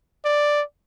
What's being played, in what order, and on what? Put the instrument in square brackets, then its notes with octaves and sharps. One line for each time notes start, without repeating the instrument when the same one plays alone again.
[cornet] D5